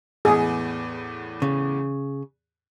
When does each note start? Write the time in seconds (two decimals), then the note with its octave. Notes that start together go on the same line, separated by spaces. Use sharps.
0.25 E2 A2 B3 G#4
1.42 C#3